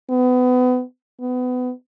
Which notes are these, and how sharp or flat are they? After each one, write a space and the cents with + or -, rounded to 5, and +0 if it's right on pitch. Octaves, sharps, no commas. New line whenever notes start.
B3 +30
B3 +25